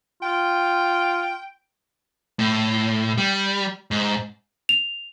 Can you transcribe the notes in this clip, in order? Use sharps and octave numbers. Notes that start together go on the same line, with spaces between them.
F4 G5
A2
G3
G#2
F7